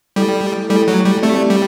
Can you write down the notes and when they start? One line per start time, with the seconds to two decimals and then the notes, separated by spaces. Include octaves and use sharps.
0.16 G3 A3 E4 A4
0.70 G3 A3 E4 A4
0.88 F#3
1.05 G3
1.23 F#3 A3 C4 G4 D5
1.50 G3